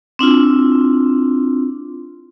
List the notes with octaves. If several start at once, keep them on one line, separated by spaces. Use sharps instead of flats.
C4 D4 E4 F4